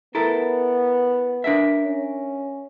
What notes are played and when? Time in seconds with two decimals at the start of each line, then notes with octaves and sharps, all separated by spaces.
0.15 B3 E4 A4 A#4
1.44 D4 A#4 E5
1.84 C#4